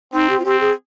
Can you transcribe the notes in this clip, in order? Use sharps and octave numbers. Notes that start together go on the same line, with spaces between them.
C4 D#4
G4
F4
C4 G4
G#4